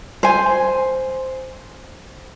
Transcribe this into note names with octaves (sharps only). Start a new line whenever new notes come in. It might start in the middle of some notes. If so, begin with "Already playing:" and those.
C5 G#5